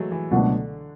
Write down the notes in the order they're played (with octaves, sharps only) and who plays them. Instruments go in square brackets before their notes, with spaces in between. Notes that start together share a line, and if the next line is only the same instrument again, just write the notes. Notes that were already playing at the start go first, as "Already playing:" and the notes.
Already playing: [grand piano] E3 F#3 G#3 A3
E3
[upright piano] C#2 B2 F#3 A3 D4 [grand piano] D3